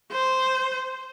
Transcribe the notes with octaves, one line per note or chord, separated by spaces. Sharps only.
C5